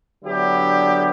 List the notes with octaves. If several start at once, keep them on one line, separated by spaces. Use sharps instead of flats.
D3 F#3 B3 D4 E4 G4